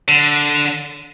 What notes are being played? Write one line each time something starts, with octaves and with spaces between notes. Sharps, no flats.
D3